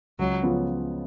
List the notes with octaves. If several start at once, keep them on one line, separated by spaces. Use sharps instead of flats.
C#2 F#3
C#3 F3 B3 F4